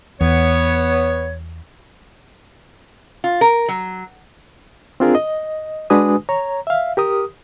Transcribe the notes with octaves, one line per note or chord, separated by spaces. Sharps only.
E2 B3 C#5
F4
A#4
F#3
C4 D4 F4 G#4 A#4
D#5
G#3 D4 F#4 B4 G#5 D#6
C#5 A#5
E5 F5
G4 A#4 D#6